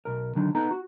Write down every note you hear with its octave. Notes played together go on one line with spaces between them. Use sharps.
B1 A#4
D3 D#3 F#3
B3 D#4 A4 A#5
F#4